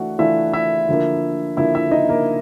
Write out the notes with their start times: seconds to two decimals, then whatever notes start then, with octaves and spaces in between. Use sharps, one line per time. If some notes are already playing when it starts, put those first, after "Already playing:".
Already playing: E3 A3 D4 F#4 F#5
0.19 E3 A3 D4 E4 F4 E5
0.53 E4 E5
0.88 D3 F3 A#3
1.57 D3 F3 A#3 E4 E5
1.75 E4 E5
1.91 D#4 D#5
2.09 A#3 A#4